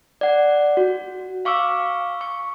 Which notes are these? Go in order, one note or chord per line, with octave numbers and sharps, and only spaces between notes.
D5 F#5
F#4
F5 C#6 D6 E6
C#6